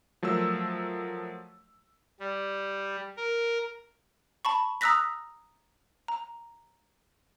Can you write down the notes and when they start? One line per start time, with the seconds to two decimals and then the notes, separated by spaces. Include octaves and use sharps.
0.23 F3 F#3 A3 A#4 E6
2.20 G3
3.17 A#4
4.45 A5 B5 C#6
4.81 A#5 D#6 E6 F#6 A#6 B6
6.08 A#5